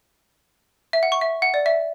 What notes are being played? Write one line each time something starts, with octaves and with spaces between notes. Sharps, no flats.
E5
F#5
C#6
E5
F#5
D5
E5